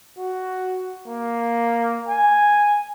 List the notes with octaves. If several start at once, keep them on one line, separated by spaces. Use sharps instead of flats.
F#4
A#3
G#5